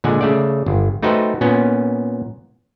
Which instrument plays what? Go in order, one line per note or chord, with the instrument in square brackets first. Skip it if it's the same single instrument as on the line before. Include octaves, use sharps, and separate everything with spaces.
[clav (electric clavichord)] A#2 D3 G#3 F#5 G#5
C#3 A3 D5
G1
A3 D#4 F#4 B4 C5 G5
A#2 B3 C#4